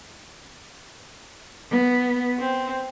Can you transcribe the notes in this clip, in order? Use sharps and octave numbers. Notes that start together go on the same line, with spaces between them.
B3
C4